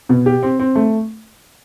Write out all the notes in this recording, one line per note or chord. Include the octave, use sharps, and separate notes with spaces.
B2
G4
C4
C4
A3